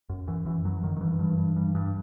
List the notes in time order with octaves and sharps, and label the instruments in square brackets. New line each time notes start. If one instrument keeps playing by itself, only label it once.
[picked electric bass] F#2
F#2 E3
F#2 E3
F#2 F#3
F#2 D#3
D#3
G2 E3
G2
G2
G2
G2